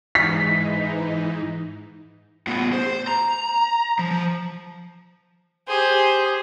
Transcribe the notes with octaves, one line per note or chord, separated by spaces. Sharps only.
G#2 E3 D#4 B6
A2 B3
C5
A#5
F3
F3
G4 G#4 C5